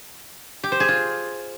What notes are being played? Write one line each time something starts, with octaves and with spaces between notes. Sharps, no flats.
G4
C5
G#4
F4